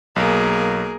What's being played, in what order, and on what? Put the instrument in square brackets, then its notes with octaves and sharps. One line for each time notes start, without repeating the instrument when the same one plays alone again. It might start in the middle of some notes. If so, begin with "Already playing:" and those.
[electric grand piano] B1 [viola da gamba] A#3 G#4 A#4